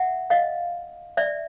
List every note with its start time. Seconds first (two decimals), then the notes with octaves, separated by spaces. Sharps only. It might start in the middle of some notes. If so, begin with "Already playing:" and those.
Already playing: E5 F#5
0.30 D#5 F5
1.17 D5 E5